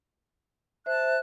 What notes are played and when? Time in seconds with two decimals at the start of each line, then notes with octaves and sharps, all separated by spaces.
0.86 C5 E5 A5 F#6